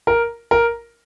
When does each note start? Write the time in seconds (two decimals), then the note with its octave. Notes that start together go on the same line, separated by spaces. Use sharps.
0.07 A#4
0.51 A#4